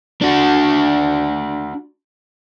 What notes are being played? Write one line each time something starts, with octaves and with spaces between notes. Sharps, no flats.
D4 F#4